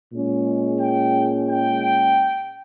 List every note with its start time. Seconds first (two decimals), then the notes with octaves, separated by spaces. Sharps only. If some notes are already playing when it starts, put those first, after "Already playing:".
0.12 A#2 G#3 C#4
0.81 G5
1.50 G5